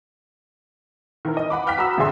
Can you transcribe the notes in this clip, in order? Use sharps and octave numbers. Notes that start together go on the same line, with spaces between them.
D#3 E4 A#4
D#5
F#5 B5 D6
F5 G5 F6 F#6 B6
F#4 A#5 B5 D#6 E6
A#1 G2 D3 G#4 E5 C6